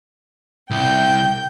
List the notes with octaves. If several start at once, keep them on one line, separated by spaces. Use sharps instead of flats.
C2 G5 G6